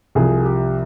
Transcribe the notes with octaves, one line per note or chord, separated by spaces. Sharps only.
C2 C3 F3 G#4
G4